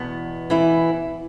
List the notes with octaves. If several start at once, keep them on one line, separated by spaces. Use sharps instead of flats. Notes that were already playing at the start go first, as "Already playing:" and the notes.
Already playing: E2 B2 B3
E3 E4